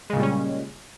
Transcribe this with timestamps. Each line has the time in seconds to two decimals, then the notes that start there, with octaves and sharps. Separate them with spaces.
0.10 G#3
0.13 C#3
0.16 A#2
0.20 G3
0.23 C#4